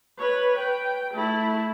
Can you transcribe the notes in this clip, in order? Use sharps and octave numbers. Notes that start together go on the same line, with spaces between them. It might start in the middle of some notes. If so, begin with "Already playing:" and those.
B4 C#5
G5
A3 E4